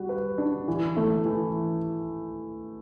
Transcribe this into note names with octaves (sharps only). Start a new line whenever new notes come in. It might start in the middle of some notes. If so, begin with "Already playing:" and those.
Already playing: G3 F#4
B4
D4
E3
A3
E3